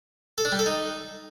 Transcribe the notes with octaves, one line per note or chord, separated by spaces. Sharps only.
A4
D4
G3
A4
D#4